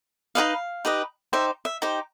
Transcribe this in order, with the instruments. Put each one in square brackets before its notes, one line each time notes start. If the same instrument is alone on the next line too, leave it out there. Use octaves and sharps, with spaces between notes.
[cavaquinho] D#4 G4 B4 D#5 F5
D#4 G4 B4 D#5
D#4 G4 C5 E5
E5
D#4 G4 C5 G5